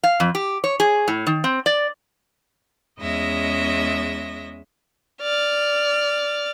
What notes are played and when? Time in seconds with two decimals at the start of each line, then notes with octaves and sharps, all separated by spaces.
0.03 F5
0.20 F2
0.35 G4
0.64 C#5
0.80 G#4
1.08 A2
1.27 D#3
1.44 C4
1.66 D5
2.99 E2 G#3 C#4 D#5 E5 A#6
5.22 D5 F6